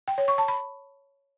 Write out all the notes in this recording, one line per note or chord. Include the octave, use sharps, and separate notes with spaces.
G5
C#5
C#6
A5
B5